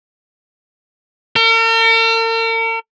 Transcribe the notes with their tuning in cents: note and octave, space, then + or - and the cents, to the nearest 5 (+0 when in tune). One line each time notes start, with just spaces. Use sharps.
A#4 -45